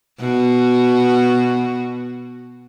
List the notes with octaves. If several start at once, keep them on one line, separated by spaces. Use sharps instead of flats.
B2 F#4